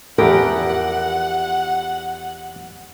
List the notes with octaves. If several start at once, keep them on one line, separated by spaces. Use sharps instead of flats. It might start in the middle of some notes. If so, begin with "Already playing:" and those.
E2 E3 F3 G4 A#4 F#5